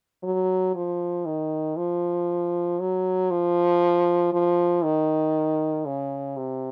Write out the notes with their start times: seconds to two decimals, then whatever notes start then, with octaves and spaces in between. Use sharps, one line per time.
0.23 F#3
0.75 F3
1.26 D#3
1.77 F3
2.79 F#3
3.31 F3
4.33 F3
4.84 D#3
5.86 C#3
6.37 C3